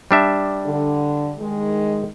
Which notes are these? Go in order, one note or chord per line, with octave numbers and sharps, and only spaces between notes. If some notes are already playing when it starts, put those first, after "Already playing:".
G3 D4 E5
D3
D#3 G#3